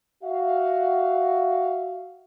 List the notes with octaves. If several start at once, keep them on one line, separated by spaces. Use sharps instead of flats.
F#4 E5 F5